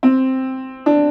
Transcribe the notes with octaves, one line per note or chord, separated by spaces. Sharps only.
C4
D4